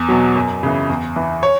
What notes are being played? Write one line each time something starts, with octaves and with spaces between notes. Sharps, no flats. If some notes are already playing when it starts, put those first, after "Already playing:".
Already playing: E2
B2 F#3
F#2
C#3 E3
E2
E3
C#5